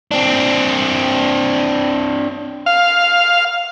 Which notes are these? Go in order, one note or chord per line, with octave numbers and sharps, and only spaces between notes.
C4 D4
F5